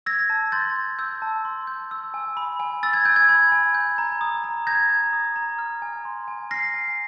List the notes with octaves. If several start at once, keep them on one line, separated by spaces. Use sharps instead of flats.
E6 G#6 A#6
A5
C6 G6 A6
G6
E6 G6
A5
C6
G6
E6
G#5
B5
G#5
E6 A6
G#6
G#5 G6
G#6
B5
G#5
G6
A#5
D#6
A#5
G6 G#6 A#6
A#5
D#6
A#5
F6
G#5
C6
G#5
F6 A#6 C7
G#5